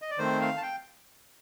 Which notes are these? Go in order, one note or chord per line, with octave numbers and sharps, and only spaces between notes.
D#5
D5
D#3 A3 C4 C5
F5
A5
G5